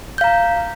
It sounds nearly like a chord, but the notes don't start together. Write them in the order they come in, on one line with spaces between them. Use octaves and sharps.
G6 F5 A#5